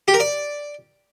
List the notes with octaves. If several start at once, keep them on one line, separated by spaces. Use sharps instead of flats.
G4
A#4
D5